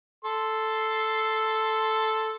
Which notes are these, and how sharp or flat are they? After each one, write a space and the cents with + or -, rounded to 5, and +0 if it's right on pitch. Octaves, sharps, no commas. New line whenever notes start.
A4 +0 C6 +0